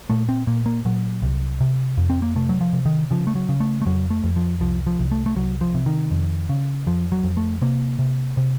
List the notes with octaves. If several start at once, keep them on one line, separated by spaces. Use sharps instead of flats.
A#2 A3
C4
A#2 A#3
A#3
A#2 F#3
C2
C3
F2
C4
A#3
C3 A3
F#3
F3
C3
D#3
C#3 F3
A3
F#3
C#3
A3
A3
F2 F#3
A3
F2
F3
C2 F3
F3
C2
A3
A3
C2 F#3
F3
C3
D#3
F2
C#3
F2 F3
F#3
F2
A3
C3 A#3
C3
C3